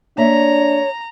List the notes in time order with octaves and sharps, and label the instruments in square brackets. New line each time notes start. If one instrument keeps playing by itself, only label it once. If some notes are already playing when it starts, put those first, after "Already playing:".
[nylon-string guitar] A#3 E5 [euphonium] D4 [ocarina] C#5 [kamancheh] A#5